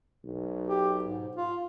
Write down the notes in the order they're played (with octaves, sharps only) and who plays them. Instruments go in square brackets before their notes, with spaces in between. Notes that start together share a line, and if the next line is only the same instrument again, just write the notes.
[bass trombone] B1
[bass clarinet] G4
G#2
F4